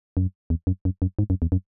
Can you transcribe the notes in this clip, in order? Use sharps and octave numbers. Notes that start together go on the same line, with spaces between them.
F#2
E2
F#2
F#2
F#2
G#2
F#2
E2
F#2